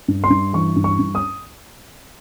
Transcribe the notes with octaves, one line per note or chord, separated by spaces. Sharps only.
G2
C6
G2
E3 C#6
G2
C#6
G2
D#6